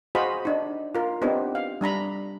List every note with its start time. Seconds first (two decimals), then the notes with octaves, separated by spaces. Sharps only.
0.15 F#4 G#4 C5 D#5 F5 B5
0.45 D4 D#4
0.95 F4 A#4
1.22 B3 C4 D4 D#4 G4
1.55 F5
1.81 G3 D4 A#5 B5